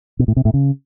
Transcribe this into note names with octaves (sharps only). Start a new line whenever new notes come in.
B2
A2
C3
A2
C#3